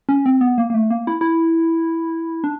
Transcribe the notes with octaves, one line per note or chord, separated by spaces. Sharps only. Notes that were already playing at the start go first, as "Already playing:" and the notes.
C#4
C4
B3
A#3
A#3
A3
A#3
E4
E4
D4